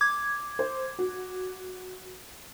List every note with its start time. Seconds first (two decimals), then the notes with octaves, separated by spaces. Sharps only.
0.01 D6 G#6
0.59 C5
0.99 F#4